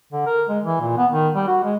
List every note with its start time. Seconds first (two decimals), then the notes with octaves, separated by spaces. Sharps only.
0.13 D3
0.27 A#4
0.49 G#3
0.64 E3
0.81 A#2
0.98 B3
1.12 D#3
1.35 G3
1.48 F#4
1.64 G#3